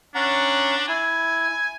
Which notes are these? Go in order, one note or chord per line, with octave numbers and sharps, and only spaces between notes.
C#4 D4 F#5 A#5
E4 G#5